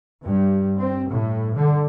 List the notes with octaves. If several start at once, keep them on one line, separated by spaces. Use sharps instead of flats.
G2
C4
A2
D3